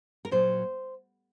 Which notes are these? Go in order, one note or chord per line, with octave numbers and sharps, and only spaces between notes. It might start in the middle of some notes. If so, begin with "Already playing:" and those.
A#4
A#2 F#3 C5